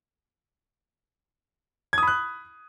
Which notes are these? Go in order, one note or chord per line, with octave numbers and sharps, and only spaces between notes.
B5 D#6 F#6 G#6